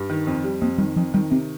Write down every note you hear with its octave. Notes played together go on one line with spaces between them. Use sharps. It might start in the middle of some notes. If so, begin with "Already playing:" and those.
Already playing: G2
D#3
F2
G3
F2 A#3
D#3 G3
F2 F3
D#3 G3
C3 C4